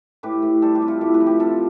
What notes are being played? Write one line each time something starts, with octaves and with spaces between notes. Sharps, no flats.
A2 G4 B4
A2
G3 A4 C5
G4 B4
C3
F4 A4
A2 E4 G4
G4 B4
F3
G4 B4
C3 F4 A4